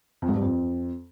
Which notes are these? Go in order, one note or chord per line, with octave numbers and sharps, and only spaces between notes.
F2
G#2
G2
F2